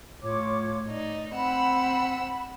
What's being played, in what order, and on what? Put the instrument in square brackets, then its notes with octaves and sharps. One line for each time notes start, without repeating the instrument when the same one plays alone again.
[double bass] A2 [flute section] F4 C#5 D6
[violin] D#4 [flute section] D5
[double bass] C4 [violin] F#5 E6 [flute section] B5